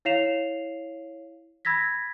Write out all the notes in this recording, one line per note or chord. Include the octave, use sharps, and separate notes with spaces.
E4 C#5 F5 C7 E7 F7
B5 E6 G#6 A#6 B6